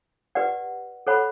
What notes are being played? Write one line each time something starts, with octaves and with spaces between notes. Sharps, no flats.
G4 B4 D5 F#5
A4 C#5 F#5 B5